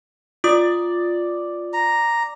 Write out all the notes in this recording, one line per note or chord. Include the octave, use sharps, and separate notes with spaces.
F4 D5 D#6
A#5